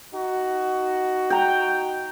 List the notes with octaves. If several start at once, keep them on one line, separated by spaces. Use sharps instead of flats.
D#4 F#4
G5 A#5